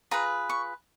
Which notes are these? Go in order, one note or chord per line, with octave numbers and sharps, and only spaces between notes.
F4 G#4 B4 A#5
C#6